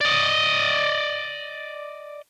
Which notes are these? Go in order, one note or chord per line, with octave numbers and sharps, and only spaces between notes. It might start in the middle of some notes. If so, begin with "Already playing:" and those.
D5 D#5